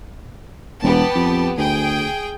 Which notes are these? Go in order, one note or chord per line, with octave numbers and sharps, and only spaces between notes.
E1 B3 G4 A5
F2
D2 G#4 G5